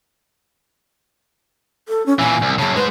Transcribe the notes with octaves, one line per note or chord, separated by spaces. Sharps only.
A4
C#4
A#2 E3 G#5
C2
F#2 C#3 A5
G#3 B4 C5